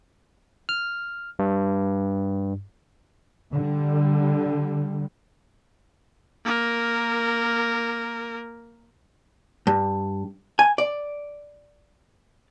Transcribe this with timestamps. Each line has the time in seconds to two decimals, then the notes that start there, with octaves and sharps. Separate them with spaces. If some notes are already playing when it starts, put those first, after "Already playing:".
0.69 F6
1.39 G2
3.53 D3 G3
6.45 A#3 A#4
9.67 G2
10.59 G#5
10.78 D5